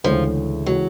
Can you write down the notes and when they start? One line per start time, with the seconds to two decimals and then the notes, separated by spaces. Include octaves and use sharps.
0.04 D2 C#3 E3 F3 G#3
0.66 C#3 E3 F#3 G#3